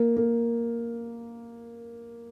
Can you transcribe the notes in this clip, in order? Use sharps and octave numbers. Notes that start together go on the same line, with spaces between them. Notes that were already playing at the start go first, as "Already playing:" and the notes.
Already playing: A#3
A#3